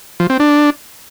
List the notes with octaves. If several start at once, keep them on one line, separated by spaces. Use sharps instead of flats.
F3
C4
D4